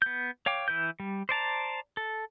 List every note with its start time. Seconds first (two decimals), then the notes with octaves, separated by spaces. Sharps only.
0.02 B3 G6
0.46 C#5 F5 G5 D6
0.68 E3 E4 B4 G6
1.00 G3
1.29 C5 D5 A5 A#5
1.97 A4